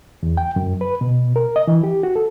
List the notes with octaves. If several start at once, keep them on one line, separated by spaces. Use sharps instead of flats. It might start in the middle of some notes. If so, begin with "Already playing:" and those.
E2
G5
F#2
B4
B2
A#4
D#5
E3
G4
F#4
A4